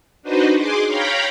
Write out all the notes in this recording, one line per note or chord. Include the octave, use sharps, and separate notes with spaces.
D4 D#4 F#4 B4 C5 D#5
G#4 C6 D6
C#5 F5 G5 A#5 B5